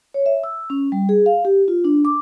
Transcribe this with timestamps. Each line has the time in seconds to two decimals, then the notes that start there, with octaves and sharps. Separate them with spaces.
0.14 C#5
0.26 E5
0.44 E6
0.70 C#4
0.92 G3
1.09 G#4
1.26 F5
1.45 G4
1.68 F4
1.84 D4
2.05 D6